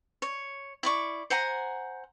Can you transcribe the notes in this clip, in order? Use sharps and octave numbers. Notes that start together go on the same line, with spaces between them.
C#5
E4 D5 C#6
C5 F#5 G#5 A#5